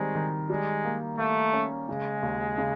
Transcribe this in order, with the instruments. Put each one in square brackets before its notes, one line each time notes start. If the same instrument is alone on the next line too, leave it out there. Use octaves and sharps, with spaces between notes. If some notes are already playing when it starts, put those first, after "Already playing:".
Already playing: [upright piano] D#3 G3 C4 [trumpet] G#3
[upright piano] D#3
[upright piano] G3 [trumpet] G#3
[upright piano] A#3
[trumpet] A3 [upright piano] A#3
[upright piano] C#4
[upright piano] C#3 [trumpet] G#3
[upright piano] D#2
C#3